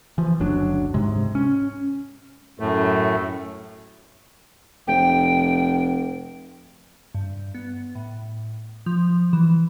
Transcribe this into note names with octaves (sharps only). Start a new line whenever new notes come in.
E3 F3
F#1 D2 F#3 D4
G#2 C3 G#3
C#4
F#2 A2 A3
F1 G5
G2
B3
A2
F3
E3